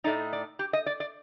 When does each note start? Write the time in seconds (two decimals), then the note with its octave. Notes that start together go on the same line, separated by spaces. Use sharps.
0.04 A2 A3 D#4 D5
0.33 D5
0.59 G4
0.73 D#5
0.86 D5
1.00 D5